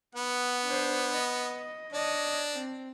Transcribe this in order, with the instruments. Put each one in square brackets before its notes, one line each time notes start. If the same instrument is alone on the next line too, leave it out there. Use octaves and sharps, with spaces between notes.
[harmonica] B3 [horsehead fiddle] F#5
[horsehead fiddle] D4 C5
D#5
[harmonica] D4 [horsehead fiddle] C#5 D#5
[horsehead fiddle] C4